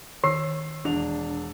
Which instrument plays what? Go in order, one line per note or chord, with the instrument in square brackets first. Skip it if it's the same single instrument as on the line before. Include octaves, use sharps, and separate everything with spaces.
[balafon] D#3 [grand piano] E6 C7
[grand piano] E1 D4 F7